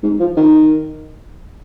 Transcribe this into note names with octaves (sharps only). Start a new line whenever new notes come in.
G#2
F3
D#3